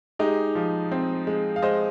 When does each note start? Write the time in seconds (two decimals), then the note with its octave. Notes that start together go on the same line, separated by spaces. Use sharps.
0.19 G#3 D#4 G4
0.55 F3
0.92 C4
1.27 G#3
1.56 F5
1.62 G#3 C5 D#5